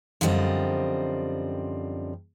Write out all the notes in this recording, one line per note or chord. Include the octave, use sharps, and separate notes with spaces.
F#2 D3 F3 G3 C4 D#5